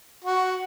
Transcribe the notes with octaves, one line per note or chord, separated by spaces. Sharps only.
F#4